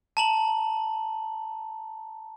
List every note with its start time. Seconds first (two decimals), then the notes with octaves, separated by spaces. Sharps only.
0.17 A5 A#5 F#7